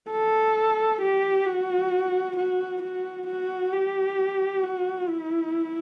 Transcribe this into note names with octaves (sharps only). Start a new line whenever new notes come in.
A4
G4
F#4
F#4
F#4
F#4
G4
F#4
E4